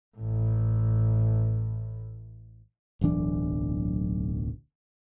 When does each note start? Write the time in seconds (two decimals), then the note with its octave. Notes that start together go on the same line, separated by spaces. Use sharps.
0.17 A1 A2
3.01 D1 B1 E3 D4